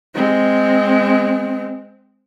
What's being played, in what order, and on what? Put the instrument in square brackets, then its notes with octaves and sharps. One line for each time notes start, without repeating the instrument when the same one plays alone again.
[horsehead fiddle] G#3 C4